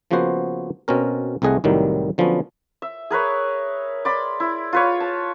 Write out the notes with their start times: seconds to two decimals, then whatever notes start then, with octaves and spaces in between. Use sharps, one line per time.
0.11 C#3 F3 A#3 B3 F#4 C5
0.88 B2 C4 C#4 A#4
1.42 C2 C3 A3 G#4 D#5 F#5
1.64 C2 A2 D#3 F#3 G3
2.18 D3 F3 F#3 B3 C#4
2.82 E5
3.10 G#4 A#4 B4 C#5
4.05 D5 B5 C6
4.40 E4
4.73 F4 B4 C#5
5.00 A5